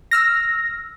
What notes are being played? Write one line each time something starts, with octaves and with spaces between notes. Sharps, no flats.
E6 F6 A#6